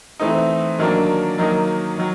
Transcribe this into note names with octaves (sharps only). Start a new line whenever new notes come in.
E3 A3 C4 D#4
D#3 F#3 A#3 D4
D#3 F#3 A#3 D#4
D#3 F#3